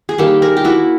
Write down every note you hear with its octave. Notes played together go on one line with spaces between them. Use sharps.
G#4
D#3 G3 A#3 G4 A4
G#4 A#4
G4
E4 F#4